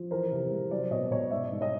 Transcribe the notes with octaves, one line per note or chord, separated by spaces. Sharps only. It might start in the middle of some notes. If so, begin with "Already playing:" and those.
Already playing: F3
E3 A#4 C5
C3
G#3
F#3 C5 D5
B2 C#5 D#5
B2 C#5 D#5
G#2 D5 E5
G#2
C#5 D#5